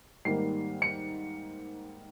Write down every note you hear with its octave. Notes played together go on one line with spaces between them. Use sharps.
G#2 D#3 G3 A#3 C7
C#7